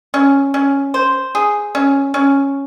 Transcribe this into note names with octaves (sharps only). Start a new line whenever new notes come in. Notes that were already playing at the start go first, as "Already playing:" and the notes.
C#4
C#4
C5
G#4
C#4
C#4